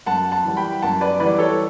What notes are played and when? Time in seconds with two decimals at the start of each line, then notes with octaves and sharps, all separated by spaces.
0.06 F#2 F#5 A5
0.32 F#5 A5
0.44 E3 G3
0.57 G5 B5
0.82 F#2 F#5 A5
1.01 B4 D5
1.20 E3 G3 B4 D5
1.38 A4 C#5